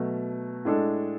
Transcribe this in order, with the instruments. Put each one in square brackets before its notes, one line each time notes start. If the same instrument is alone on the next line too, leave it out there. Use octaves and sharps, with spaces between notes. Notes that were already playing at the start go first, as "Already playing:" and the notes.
Already playing: [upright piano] B2 F#3 A3
A2 G#3 D4 A4